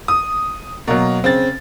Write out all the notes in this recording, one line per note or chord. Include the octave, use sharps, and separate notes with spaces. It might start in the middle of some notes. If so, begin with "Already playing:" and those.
D#6
B2 F#3 A#3 A#4
C#3 C4 A6